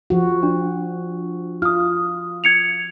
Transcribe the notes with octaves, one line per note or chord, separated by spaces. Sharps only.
F3 F#4
D4
F4 D#6 F6
G#6 C#7 F7